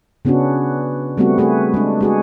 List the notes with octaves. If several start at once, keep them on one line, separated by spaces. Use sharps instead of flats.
C#3 B3 C#4 D4 F#4
G3 A3 B3 C4 F#4
A3 F#4 G#4 B4
G#3 D4
G#3 F#4 G#4